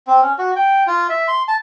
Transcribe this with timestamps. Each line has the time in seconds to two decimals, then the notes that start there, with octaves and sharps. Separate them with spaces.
0.07 C4
0.22 C#4
0.38 F#4
0.56 G5
0.87 F4
1.10 E5
1.28 C6
1.48 A5